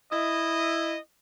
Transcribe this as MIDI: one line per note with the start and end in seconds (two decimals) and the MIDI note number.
0.12 0.97 64
0.12 0.97 75